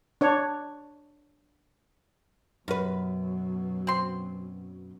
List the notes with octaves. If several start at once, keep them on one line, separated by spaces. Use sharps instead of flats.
D4 C#5
F#2 B2 F#3 B4
C4 C6